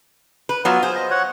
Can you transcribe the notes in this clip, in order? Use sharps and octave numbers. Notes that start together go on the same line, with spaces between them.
B4
F#3 B3 F4
G#4 C5
D#5
C#5 F#5